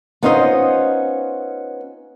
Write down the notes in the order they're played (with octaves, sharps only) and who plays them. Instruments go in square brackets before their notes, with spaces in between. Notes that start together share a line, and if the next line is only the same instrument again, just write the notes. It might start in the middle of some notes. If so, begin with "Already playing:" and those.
[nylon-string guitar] B3 C#4 D#4 F4 C5 D#5